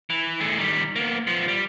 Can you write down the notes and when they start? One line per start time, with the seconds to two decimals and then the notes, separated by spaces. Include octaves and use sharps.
0.10 E3
0.40 A3 G#4
0.58 D#3 G3
0.96 A#3 B3
1.27 F3 B3
1.48 G3